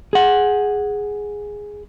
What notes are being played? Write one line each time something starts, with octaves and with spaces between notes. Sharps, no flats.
G#4 F#5